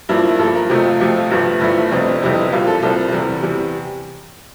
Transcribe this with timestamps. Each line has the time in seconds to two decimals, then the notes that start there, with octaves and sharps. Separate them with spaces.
0.09 G2 F3 A#3 E4
0.18 D4
0.29 E4
0.39 G2 F3 A#3 A4
0.55 A#4
0.70 F2 C3 F3 A3 G4
0.85 F4
1.00 F2 C3 F3 A3 F4
1.31 G1 G2 F3 A3
1.61 G1 G2 F3 A3 E4
1.91 G1 F2 C3 G3 C4 D4
2.21 G1 F2 C3 G3 C4 E4
2.52 C2 A#2 G3 C4 F4
2.67 A4
2.82 C2 A#2 G3 C4 A4
3.12 E2 C3 G3
3.43 E2 C3 G3